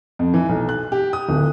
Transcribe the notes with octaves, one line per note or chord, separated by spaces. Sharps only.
F2
E3
B1
F#6
G4
D#6
D1